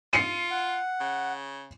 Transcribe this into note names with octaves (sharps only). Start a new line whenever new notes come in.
F4 C7 C#7 D#7
F#5
C#3